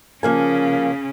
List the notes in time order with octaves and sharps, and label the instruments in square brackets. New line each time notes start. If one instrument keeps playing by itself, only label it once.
[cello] C#3 C#4 [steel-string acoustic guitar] F3 A#3 G#5